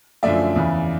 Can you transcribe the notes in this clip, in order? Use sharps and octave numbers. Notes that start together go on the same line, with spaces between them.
F#2 D3 F3 A3 D5 E5
E2 C#3 E3